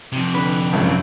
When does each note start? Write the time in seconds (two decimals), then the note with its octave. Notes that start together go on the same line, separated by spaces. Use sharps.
0.12 F2 C3
0.35 D3 B4
0.73 G#1 C#2 F#2